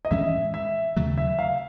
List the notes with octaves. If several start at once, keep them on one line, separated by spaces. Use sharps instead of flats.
D#5
A2 E3 G#3 C#4 E5
E5
D#2 C#3 F#3 A3
E5
F5